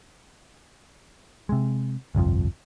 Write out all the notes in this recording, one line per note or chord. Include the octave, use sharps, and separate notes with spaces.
C3 G#3
G1 C2 F2 F3